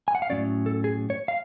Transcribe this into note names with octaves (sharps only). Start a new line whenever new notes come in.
G#5
F#5
F5
A2 F#3 C#4 D5
A4
G#4
C#5
F5